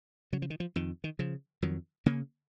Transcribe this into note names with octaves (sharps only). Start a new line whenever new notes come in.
C#3 F#3
F3
D#3
F3
F2 D#3
D#3
C#3 F3
F2 D#3 F#3
C#3 A#3 C#4